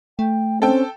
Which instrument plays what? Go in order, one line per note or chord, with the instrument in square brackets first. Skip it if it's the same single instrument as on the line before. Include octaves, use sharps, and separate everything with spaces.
[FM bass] A3 [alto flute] G5
[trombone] C4 [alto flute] C#4 [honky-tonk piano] A4 G5